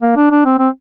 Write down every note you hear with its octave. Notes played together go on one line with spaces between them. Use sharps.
A#3
D4
D4
C4
C4